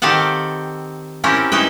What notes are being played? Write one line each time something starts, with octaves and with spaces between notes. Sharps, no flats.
D#3 C4 G4 A4 F5 F#5
C4 C#4 E4 G4 A#4
C#4 D#4 E4 B4 G5